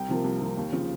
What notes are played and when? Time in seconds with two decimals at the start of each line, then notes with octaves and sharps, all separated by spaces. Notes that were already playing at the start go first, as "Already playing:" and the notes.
Already playing: C2 G5
0.08 C3 F3 A#3
0.24 C2
0.41 C3 F3 A#3
0.57 D#2
0.73 C#3 F3